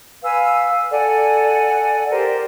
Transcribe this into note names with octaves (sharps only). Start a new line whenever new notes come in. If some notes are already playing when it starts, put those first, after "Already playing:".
B4 F5 G#5 E6
A4 D5 F#5 G#5
G4 A#4 C5 D5